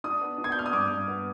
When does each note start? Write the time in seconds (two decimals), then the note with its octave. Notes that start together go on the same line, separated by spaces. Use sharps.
0.04 D4 D#6
0.21 B3
0.38 D4
0.44 G#6
0.52 G6
0.55 D4 F6
0.66 D#6
0.73 G2 D6
0.90 G2
1.08 B3